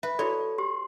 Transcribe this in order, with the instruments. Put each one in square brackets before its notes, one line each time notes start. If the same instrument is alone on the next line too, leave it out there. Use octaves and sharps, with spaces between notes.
[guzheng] B4 [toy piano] E5
[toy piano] E4 F#4 D5 [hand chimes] A4 [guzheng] C#5
[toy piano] G4 [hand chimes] C6